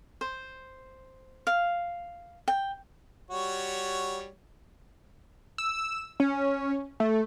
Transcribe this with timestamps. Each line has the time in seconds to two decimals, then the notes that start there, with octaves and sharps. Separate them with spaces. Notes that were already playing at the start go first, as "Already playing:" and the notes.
0.21 C5
1.47 F5
2.48 G5
3.31 G3 F#4 C#5
5.58 E6
6.20 C#4
7.00 A3